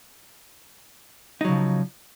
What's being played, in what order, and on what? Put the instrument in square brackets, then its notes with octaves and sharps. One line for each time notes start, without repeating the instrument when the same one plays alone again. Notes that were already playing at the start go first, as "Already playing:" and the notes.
[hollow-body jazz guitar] D#4
F#3
C#3
F3